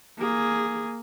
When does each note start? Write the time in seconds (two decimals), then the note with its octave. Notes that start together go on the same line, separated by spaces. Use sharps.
0.18 A#3 G#4